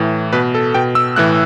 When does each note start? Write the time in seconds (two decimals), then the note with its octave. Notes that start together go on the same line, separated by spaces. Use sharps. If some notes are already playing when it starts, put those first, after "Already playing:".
Already playing: A2 E3
0.33 B2 B4
0.55 A4
0.74 B2 G5
0.95 E6
1.16 A2 E3 F#6